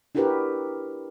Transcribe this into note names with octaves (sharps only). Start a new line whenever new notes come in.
D4 E4 F#4 G4 A#4 B4